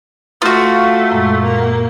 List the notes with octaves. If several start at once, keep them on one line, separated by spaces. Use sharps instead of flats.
A3 F4 F#4
F#2 A#2 G#3
A#2 A#3